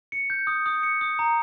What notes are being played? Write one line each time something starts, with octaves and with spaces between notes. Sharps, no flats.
C#7
G6
D#6
D#6
C#7
D#6
A#5